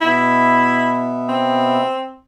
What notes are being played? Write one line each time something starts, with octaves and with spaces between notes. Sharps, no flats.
B2 B3 E4 E5
C4